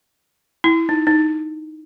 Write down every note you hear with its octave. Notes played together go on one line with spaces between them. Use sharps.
E4
D#4
D#4